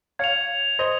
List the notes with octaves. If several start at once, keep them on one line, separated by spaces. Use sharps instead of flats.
C#5 F5 G#6 C#7 F7
C5 D#5